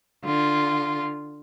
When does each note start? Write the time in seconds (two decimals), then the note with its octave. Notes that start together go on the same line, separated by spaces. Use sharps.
0.24 D3 F4